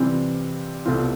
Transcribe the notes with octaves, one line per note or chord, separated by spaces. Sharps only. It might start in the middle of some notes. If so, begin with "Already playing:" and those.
Already playing: C3 E3 G3 C4 F4
C2 B2 A3 C4 F4